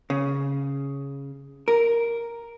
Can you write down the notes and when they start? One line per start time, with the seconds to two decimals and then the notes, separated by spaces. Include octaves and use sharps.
0.10 C#3
1.68 A#4